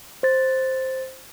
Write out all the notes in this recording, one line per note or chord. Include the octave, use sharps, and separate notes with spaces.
C5 A6